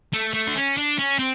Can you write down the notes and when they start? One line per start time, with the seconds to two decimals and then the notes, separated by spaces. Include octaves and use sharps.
0.13 A3
0.34 A3
0.48 D4
0.56 C#4
0.77 D4
0.98 C#4
1.19 C4